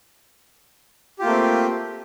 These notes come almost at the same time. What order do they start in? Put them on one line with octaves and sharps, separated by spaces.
G4 F4 A#3 A3 C4